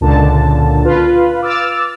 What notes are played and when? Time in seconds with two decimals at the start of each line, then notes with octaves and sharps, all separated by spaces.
0.01 C#2 A#2 D3 A5
0.84 F4 B4
1.42 D6 E6 F6 A6